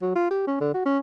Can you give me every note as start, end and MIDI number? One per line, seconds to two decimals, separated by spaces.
0.02 0.13 54
0.15 0.30 65
0.30 0.45 67
0.47 0.58 61
0.61 0.72 50
0.74 0.81 66
0.86 0.98 61